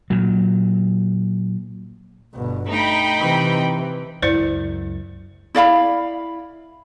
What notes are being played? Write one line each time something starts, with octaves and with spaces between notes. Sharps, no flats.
A#2 F#3
G1 B2
A3 D#4 G5 B5
C3 E3
C#2 F#2 E4 C5 D5
E4 D5 F5 B5